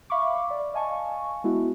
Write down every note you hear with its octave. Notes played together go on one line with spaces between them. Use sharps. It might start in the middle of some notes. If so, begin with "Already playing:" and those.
E5 F5 B5 C#6 D6
D5
D#5 F5 G#5 A5 C#6
G#3 B3 E4 F#4